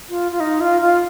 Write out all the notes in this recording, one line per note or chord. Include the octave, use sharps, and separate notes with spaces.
F4
F4
D#4
F4
F4